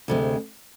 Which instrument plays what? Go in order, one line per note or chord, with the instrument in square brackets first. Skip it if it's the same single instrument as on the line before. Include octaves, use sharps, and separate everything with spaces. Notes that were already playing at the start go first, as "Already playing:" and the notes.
[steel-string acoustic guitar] D2 C3 G#3